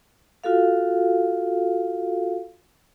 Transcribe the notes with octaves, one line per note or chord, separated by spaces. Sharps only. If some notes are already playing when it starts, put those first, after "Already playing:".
F4 F#4 A4 F5